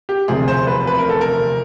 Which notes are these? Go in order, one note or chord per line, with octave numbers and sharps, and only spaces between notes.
G4
E1 D2 C3 F3 G#4
C5
B4
B4
A#4
A4
A#4